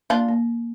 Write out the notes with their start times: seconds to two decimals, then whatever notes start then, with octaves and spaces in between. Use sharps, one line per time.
0.10 A#3 D4 F4
0.28 A#3